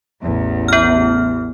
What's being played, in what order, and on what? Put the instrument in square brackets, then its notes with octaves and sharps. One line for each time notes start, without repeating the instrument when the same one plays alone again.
[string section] A1 E2
[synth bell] B3 F6